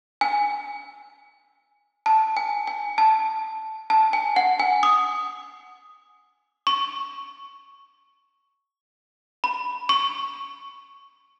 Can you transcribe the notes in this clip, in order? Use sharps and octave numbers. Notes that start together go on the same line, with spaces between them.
G#5
A5
G#5
G#5
A5
A5
G#5
F#5
G#5
D#6
C#6
B5
C#6